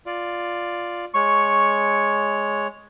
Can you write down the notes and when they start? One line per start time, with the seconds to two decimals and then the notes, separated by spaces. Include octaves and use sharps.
0.06 F4 D5
1.15 G#3 C#5 C#6